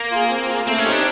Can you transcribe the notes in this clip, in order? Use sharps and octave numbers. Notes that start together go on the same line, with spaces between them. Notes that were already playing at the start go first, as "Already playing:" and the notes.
Already playing: A#3
F4 G#4
C4
F4 G#4
A3 C4
C#4
C4 D#4 G4
D4